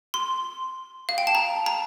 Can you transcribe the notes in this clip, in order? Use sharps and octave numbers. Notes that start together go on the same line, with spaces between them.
C6
F5
G5
A5
A#5
A#5